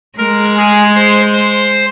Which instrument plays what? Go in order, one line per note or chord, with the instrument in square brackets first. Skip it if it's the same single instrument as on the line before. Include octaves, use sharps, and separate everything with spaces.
[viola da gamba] G#3 [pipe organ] A#4
[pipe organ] G#4
C5
C5